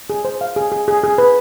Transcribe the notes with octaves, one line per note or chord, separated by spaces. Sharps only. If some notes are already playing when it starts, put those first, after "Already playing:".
G#4
C5
F5
G#4
G#4
G#4
G#4
B4